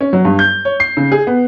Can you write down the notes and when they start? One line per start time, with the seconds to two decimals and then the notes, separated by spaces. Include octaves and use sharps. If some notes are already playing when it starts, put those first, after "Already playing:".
0.01 C#4
0.13 F#3
0.25 G2
0.39 G6
0.65 C#5
0.80 C7
0.97 C#3
1.12 G#4
1.27 B3